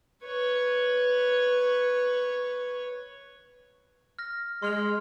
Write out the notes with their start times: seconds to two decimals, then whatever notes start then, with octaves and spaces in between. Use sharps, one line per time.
0.23 B4 C#5
4.19 F6 A#6
4.62 G#3 C6 F6 F7